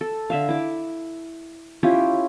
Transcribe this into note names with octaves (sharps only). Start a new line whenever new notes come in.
A4
D3 E5 F5
E4 D6
C#4 E4 F4 G4